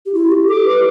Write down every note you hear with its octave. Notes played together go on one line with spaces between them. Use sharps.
G4
E4
G4
A4 D6
B4